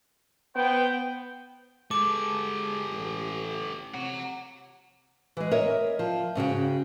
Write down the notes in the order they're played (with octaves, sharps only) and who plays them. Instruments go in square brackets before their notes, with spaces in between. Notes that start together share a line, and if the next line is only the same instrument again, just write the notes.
[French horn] B3 [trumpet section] C5 G5
[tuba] G#3 [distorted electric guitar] G4 A4 [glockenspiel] D6
[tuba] A1
[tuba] C3 [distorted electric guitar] F#5 A#5
[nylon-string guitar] E3 G#3
A#4 C#5 D#5 E5
F3
G#2 C#3 F#4 G5